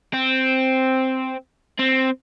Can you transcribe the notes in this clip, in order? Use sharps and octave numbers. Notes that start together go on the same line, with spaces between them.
C4
C4